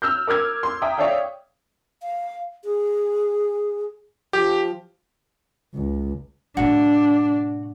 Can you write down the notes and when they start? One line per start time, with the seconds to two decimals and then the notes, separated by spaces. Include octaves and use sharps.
0.02 E6 F6 G6
0.27 A#4 D6 F6 G#6
0.63 C6
0.82 E5 G5 A#5 D#6
0.98 C#5 D5 E5 F5 G5
2.02 F5
2.64 G#4
4.33 F3 G4
5.75 C#2
6.57 A2 C3 D4 F#4